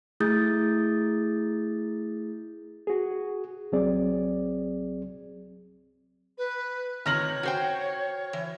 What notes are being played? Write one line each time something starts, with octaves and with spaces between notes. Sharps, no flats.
A3 E4 G#4 D#6 G6 A6
F#4 G#4
C2 F#3 C4 G#4 D5
B4
A2 C3 D#3 C#5 F6 A#6 F#7
F#4 C5 G5
E3